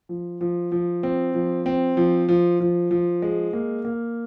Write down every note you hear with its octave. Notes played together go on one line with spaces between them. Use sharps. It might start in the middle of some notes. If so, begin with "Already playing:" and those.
F3
F3
F3
C4
F3
C4
F3
F3
F3
F3
G#3
A#3
A#3